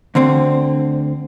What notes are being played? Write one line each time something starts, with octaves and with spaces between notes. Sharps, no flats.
D2 D3 C4